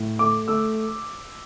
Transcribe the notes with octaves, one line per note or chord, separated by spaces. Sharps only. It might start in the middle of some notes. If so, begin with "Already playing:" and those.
Already playing: A2
A3 D6
A3 E6